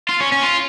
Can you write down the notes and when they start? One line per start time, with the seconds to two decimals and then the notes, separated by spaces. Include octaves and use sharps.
0.09 F4
0.21 C#4
0.32 C#4
0.43 F4